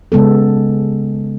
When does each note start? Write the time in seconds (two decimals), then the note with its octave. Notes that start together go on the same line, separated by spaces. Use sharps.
0.12 C#3 G#3 B3 A4